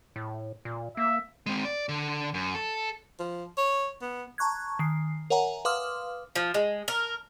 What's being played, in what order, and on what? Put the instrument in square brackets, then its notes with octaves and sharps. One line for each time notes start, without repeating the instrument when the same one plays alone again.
[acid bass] A2
A#2
[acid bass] A#3 [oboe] E5
[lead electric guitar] G#3 C4
D5
D3
F#2
A4
[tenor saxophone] F3
C#5
B3
[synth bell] A5 A#5 C#6 F#6 G#6
D#3 C7
A#4 C#5 E5 F#5 G#5 A#5
B4 F5 C6 D6 D#6 F6
[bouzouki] F3
G#3
A#4